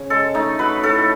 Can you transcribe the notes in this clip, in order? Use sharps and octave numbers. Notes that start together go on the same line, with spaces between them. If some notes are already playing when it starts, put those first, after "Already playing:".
Already playing: C#3
G#3 A4
A3 D#4
F#3 B4
A2 A4